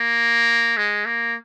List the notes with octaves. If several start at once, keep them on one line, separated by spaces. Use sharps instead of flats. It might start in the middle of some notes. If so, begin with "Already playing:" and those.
Already playing: A#3
G#3
A#3